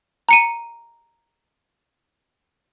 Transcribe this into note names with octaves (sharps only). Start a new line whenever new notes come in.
A#5 C#7 D#7